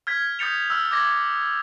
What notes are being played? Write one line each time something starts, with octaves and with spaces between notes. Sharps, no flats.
F6 G#6 B6
D#6 G6 A6 C#7 F7
E6 F6
D6 G#6 A#6